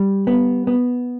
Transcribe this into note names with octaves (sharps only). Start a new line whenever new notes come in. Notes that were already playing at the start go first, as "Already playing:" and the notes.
Already playing: G3
B3
B3